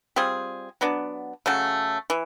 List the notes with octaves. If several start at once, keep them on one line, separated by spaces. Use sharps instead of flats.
G3 C4 F4 G#4
F#3 B3 D4
C#3 F#3 A3
E3